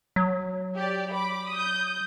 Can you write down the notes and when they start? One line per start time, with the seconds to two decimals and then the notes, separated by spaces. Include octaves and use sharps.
0.16 F#3
0.77 G4 D5
1.12 B5 D6
1.51 D#6 G6